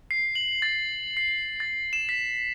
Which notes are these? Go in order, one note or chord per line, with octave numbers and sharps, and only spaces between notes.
C7
F#7
A6
C7
A6
E7
B6